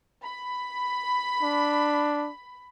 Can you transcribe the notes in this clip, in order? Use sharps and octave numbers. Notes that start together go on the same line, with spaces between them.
B5
D4